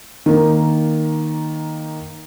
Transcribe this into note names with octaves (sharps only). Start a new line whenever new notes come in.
D#3 A#3